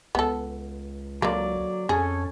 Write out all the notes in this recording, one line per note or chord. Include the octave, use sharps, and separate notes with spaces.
C#2 B3 A4
D3 F#3 A#3 D5
F2 C#4 G#4 A4 G#5